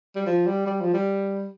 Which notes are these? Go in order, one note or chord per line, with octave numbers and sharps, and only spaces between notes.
G3
F3
G3
G3
F3
G3